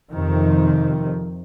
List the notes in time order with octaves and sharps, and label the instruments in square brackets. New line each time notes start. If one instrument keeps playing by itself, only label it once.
[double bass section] F2 C3 D#3